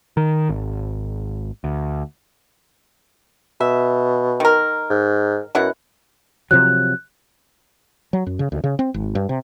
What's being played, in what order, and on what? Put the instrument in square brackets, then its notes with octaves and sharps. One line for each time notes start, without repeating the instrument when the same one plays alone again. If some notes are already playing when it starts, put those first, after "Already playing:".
[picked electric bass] D#3
G#1
D2
[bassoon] B2 [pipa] E5
[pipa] D#3 A#4
[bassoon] G#2
[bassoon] F#2 [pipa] B2 E4 F#5
[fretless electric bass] C3 F3 F#3 [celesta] F#6
[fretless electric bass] F#3
F#2
C#3
D2
C#3
C4
G#1
G2
C3